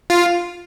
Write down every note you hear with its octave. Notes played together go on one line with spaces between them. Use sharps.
F4